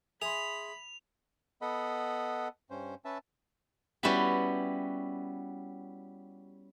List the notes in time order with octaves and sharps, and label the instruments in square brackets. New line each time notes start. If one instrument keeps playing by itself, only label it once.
[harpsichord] G#4 [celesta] E5 C6 [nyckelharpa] B5 [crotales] F7
[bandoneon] B3 A4 D#5 F#5 B5
G2 C#4 C5
C#4 B4 E5 A5
[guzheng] G3 B3 C#4 E4 F#4 G4